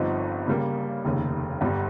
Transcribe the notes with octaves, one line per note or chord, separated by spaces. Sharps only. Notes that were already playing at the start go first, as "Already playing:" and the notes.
Already playing: G1 G2 F3 C4 D#4
C#3 G3 A#3
F1 D#2 C#3
G1 G2 G3